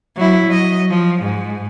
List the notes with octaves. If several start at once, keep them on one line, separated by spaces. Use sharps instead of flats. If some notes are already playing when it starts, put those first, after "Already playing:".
F#3 E4
F#3 D#5
F3
G#2